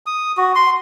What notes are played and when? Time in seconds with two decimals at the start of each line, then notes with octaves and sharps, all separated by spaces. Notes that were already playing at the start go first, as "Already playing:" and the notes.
0.06 D#6
0.37 F#4
0.55 C6